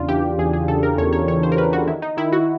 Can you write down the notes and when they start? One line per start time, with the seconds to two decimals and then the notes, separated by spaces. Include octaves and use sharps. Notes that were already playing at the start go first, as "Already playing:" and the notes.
Already playing: E2 C#3 D4 F4
0.09 E3 G4
0.39 E2 G#4
0.53 G#4
0.68 C#3 A4
0.83 A#4
0.98 E2 C#5
1.13 C#5
1.28 E3 C#5
1.43 C5
1.52 A#4
1.58 E2 B4
1.73 F#4
1.88 D#3 E4
2.02 D#4
2.17 D#3 E4
2.32 F#4